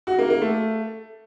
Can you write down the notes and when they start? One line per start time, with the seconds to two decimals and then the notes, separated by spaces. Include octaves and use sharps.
0.07 F#4
0.18 A#3
0.30 A#3
0.41 A3